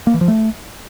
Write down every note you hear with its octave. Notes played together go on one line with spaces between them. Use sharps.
A#3
E3
F3
A3